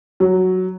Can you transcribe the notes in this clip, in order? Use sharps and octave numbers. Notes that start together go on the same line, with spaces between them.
F#3